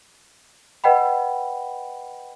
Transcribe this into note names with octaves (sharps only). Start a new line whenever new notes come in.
B4 D#5 F#5 G5 B5